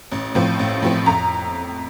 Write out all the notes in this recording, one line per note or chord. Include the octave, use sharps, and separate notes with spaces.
A1
A2 F3 C4
A1
A2 F3 C4
F2 A#5